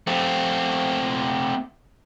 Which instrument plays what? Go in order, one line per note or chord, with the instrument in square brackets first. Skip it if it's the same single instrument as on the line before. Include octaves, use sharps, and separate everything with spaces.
[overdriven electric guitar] A3 C4